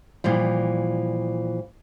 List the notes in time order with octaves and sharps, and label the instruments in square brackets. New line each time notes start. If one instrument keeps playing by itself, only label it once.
[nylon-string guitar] A#2 E3 F3 G3